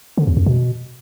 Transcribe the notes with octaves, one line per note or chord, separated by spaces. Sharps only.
D3
E2
F2
B2